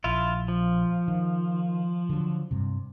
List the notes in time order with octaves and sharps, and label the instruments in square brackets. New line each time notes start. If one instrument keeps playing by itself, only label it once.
[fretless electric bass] A#1 [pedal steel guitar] E4 F4
[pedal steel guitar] F3
[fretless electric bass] D#3
D3 F#3
G2 C3